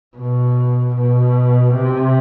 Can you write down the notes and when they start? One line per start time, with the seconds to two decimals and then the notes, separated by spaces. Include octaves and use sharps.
0.17 B2
0.96 B2
1.76 C3